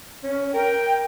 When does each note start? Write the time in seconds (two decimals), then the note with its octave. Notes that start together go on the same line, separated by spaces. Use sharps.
0.23 C#4
0.54 A#4 G5